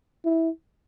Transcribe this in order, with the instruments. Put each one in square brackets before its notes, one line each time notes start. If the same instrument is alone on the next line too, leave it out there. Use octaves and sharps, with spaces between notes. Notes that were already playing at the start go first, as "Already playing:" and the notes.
[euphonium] E4